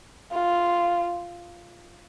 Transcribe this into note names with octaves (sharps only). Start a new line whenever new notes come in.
F4